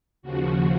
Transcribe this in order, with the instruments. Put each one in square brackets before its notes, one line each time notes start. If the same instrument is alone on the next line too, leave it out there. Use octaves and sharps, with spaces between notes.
[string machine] D#2 C#3 F3 F#4